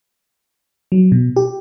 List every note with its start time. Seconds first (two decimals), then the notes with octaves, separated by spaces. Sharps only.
0.92 F#3
1.12 B2
1.36 G4